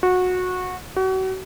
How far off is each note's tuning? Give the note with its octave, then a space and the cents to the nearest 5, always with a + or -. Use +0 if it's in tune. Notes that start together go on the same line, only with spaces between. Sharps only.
F#4 -20
F#4 +35